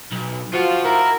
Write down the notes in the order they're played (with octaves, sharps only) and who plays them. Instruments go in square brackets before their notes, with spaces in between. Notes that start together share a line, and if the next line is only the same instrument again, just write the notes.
[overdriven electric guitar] B1
[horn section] F3 [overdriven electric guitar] F4 [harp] F#4
[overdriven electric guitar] E4 [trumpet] A#4